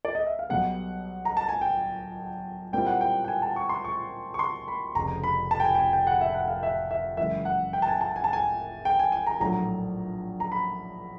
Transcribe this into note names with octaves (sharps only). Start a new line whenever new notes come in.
D5
D#5
E5
F5
B1 B2 G3 B3 F#5
A#5
A5
G#5
G5
A#2 G3 C4 E4 G5
F#5
G5
G5
G#5
A5
C#6
C6
C#6
C#6
C6
B5
F1 F2 C#3 A#5
B5
A5
G5
G#5
G5
G#5
G5
F#5
E5
F#5
F5
E5
E5
F#2 C#3 E3 G#3 E5
F#5
G5
A5
G#5
A5
G#5
A5
G#5
G5
G#5
G#5
A#5
A#1 A2 F#3 A#5
A#5
B5